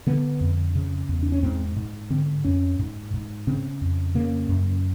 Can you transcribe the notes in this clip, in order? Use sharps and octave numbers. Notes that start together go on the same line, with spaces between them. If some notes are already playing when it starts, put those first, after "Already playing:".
D3 B3
F2
C#3
E2
D4
C#4
G#2 C4
G#2
D3 C4
F2 C#4
G#2
G#2
C#3 C4
F2
C#3 A#3
F#2